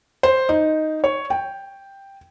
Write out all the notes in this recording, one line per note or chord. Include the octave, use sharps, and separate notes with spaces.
C5
D#4
C#5
G5